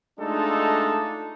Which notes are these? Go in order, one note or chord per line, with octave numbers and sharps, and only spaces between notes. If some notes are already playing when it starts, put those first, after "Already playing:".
G#3 A3 D4 D#4 F4 A4